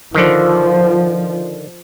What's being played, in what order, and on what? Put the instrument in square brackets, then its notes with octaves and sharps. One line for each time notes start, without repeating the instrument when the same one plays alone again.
[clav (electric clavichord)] D3 D#3 [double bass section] F3